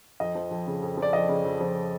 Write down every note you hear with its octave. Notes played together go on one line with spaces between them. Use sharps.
F2 D#5
F3
F2
C#3
F2
F3
D5
F2 D#5
C#3
F2
F3